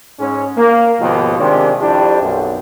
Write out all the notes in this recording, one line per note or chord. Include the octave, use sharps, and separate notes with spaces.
G#2 C#4
A#3
D#2 G#2 B2 D#3 F3
C3 D#3 G#3 D4 F4 G4
F2 D4 E4 G4
B1 F#2